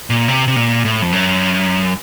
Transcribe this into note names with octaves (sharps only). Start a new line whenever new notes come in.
A#2
C3
C3
A#2
A2
F2
F#2